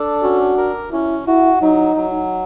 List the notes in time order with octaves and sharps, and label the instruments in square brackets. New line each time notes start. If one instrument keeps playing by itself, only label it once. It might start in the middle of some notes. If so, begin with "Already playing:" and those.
Already playing: [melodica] D4 A4
[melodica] C#4 [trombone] F#4
[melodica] A#4
[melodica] C#4 [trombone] E4
[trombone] E4 [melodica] F#4
[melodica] F#3 [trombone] D#4
[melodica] F#3